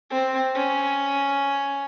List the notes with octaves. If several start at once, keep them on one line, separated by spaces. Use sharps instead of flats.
C4
C#4